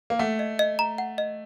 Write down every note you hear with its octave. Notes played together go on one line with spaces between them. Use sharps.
A#3
A3 F#5
D#5
D#5
A#5
F#5
D#5